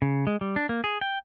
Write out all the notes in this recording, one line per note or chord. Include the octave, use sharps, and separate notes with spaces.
C#3
G#3
G3
D4
A#3
G#4
G5